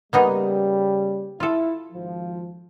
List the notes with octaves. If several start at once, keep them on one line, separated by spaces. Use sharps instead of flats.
C#3 G3 A#3 B3 D#4
E4 F4 A4
G#1 F3